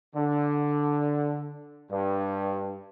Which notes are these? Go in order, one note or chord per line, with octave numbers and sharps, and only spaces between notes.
D3
G2